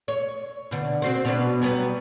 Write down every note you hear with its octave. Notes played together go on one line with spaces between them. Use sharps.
C#5
B2 D3
C4 F#4 C5
B2 B3 D4
F#3 G3 B3